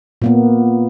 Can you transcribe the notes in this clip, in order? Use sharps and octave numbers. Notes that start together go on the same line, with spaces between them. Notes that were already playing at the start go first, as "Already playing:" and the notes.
A#2 A#3 B3